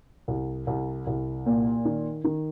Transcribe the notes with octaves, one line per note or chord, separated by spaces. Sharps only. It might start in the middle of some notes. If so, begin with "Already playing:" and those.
C2
C2
C2
A#2
D#3
D#3